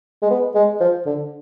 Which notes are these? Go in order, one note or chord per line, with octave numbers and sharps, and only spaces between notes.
G#3
B3
G#3
F3
D3